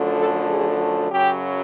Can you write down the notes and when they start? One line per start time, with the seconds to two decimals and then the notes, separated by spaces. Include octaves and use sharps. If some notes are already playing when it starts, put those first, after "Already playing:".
Already playing: F#2 D3 F3 A3
0.17 A4
0.48 G#4
1.11 F#2 C#3 F#3 G4